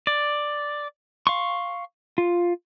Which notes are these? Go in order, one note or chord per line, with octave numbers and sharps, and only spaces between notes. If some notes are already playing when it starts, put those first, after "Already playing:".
D5
F5 C6 C#6
F4